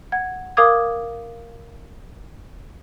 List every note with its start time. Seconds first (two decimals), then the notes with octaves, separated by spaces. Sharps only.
0.12 F#5 G#6
0.57 A#4 F5 D6 D#6 G#6